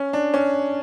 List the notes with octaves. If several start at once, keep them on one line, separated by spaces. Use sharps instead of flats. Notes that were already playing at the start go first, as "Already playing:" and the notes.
Already playing: C#4
D4
C#4